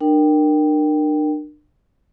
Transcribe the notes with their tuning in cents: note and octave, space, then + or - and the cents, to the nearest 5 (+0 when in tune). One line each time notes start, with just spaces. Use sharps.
D4 +40 A#4 +0 G5 +0